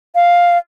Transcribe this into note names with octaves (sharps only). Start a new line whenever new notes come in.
F5